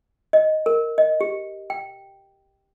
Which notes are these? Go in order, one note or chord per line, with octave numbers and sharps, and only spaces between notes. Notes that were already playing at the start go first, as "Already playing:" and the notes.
D#5
A#4
D#5
G4
G5